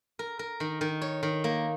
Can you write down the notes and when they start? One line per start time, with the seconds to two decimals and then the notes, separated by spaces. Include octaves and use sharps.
0.19 A#4
0.39 A#4
0.60 D#3
0.81 D#3
1.02 C#5
1.23 D#3
1.44 A#3